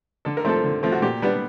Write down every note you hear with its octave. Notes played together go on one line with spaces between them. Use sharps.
D3 A4
A#4
F3 A3 C4 A4
D3
F3 A3 C4
F#4
A#2 G4
G3 B3 D4